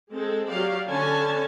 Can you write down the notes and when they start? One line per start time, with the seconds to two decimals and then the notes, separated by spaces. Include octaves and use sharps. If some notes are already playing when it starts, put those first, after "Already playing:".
0.11 G#3 C4 A4
0.48 F#3 G4 D5 F5
0.89 D3 C#4 A4 C#5 G#5 A5